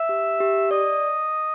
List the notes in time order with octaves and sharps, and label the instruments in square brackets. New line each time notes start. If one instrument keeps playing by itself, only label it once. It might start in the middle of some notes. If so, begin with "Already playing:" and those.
Already playing: [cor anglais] E5
[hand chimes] G4
G4
[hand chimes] D5 [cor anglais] D#5